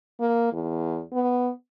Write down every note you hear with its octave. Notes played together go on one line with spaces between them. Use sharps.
A#3
E2
B3